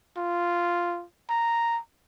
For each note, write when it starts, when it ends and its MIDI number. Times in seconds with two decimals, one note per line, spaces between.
0.17 1.04 65
1.29 1.80 82